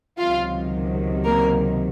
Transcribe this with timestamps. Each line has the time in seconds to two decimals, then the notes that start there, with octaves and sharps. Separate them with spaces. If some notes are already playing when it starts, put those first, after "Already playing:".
0.18 C#2 C3 D#3 F#3 F4 F5
1.25 A#3 A#4